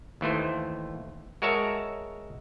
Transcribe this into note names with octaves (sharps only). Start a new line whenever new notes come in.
D#2 E3 A3 C5
G#3 F#4 A#4 C#5 E5 A5